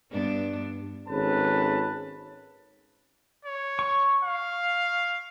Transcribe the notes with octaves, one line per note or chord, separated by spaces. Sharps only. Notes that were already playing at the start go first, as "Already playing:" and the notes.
G2 B3 D4
G#1 C#4 A4 B4 A5
C#5
C#6
F5